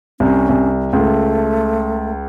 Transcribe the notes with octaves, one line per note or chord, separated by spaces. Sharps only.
C2 C#4
C2
C#2 A3